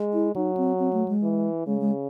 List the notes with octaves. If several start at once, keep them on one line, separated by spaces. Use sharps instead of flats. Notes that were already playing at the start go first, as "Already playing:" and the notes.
Already playing: G#3
E4
F#3 D#4
C4
C4
A3
G#3
E3
C#3 G#3
G#3